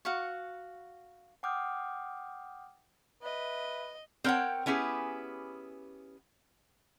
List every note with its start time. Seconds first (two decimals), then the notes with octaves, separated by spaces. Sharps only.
0.05 F#4 F5 F#5 C#6
1.43 F#5 G5 D6 D#6 F6 G6
3.23 B4 D#5 E5
4.24 C4 A#4 C#5 F#5 G5
4.66 B3 C#4 E4 G4 G#4